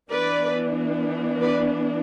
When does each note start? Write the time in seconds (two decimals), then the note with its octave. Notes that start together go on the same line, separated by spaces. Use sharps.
0.11 E3 B3 D4 B4 D5
1.41 B4 D5